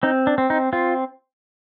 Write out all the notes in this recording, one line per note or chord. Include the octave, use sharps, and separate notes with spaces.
C4 D#4
D4
C4
D#4
C4 F4